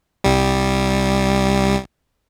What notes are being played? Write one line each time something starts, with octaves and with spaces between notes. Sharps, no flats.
C2 G3